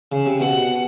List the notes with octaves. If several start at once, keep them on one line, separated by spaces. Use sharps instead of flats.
C#3
C3
B2 F#5